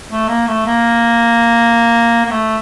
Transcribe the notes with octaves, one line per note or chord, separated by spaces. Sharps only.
A3
A#3
A3
A#3
A#3
A3